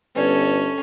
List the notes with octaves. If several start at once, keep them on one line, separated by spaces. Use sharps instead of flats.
G1 C#4 A4 B4 D5 G#6